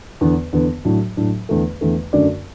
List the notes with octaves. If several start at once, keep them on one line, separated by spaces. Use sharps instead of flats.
E2 D3 B3
E2 D3 B3
A2 F#3 D4
A2 F#3 D4
E2 D3 A3
E2 D3 A3
F#2 D3 A3 F#4 D5